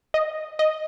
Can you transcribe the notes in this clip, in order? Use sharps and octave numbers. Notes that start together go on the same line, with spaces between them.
D#5
D#5